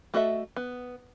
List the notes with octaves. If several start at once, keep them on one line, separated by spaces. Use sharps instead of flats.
A3 F#4 A4 D#5 E5
B3